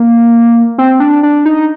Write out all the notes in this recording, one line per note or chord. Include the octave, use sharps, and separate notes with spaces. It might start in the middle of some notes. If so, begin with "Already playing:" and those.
Already playing: A#3
C4
D4
D4
D#4